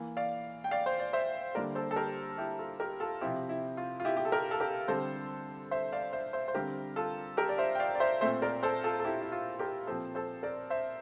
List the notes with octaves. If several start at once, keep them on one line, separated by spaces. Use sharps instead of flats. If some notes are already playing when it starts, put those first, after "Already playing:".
Already playing: E3 A#3
D5 F5
G5
D5 F5
C5
D5
C5 E5
D3 G3 A#3 A#4 D5
A4 C5
A4
G4 A#4
E4 G4
F4 A4
G4 A#4
F4 A4
C3 F3 C4 E4 G4
E4
F4
F4
E4 G4
G4
A4
G4 A#4
A4
G4 A#4
D3 G3 C4 A4 C5
C5 E5
D5 F5
C5 E5
C5 E5
C5
D3 G3 C4 G4 A#4
F4 A4
G4 A#4
D5
C5 E5
G5
D5 F5
D5
C5 E5
A#2 A3 C4 C5 E5
A#4 D5
A4 C5
F4 A4
A4
E4 G4
E4
F4
G4 A#4
A#2 F3 C4 A4 C5
A4 C5
A#4 D5
C5 E5